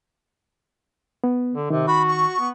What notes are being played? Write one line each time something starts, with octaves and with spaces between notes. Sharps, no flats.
B3
D3
C3 D#3
F#4 B5
C#6
B3